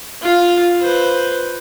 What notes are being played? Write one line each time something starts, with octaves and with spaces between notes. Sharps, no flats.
F4 F5
B4 C5